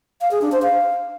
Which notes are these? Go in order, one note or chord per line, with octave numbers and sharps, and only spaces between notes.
F5
G#4
D4
C5
F5